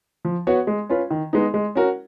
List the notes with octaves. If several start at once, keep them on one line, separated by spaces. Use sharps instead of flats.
F3
B3 F#4 C#5
G#3
C#4 F4 B4
D#3
G#3 B3 D#4
G#3
C#4 F#4 A#4